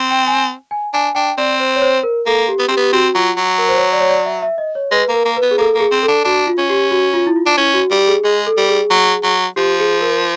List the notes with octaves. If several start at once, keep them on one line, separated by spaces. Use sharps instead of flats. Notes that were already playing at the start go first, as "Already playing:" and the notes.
Already playing: C4
G5
G#5
G#5
D4 G#5
D4 G5
C4 D5
C5
C#5
C5
A#4
A#3 A4
G4
B3
C4 G4
B3
G4
C4 F#4
F#3 F4
F#3
A#4
C5
C#5
D5
C#5
D5
E5
E5
D#5
C#5
G#3 B4
A#3
A#4
A#3
B4
B3
G#4
A#3 A4
A#3
G#4
C4
A4
D4
D4 F#4
F4
C#4
G4
F#4
F4
E4
F4
D4
C#4 E4
F#4
G3 G4
G4
G#4
G#3 G#4
A4
G3
G#4
F#3
F#3
F3 G4
G#4
A#4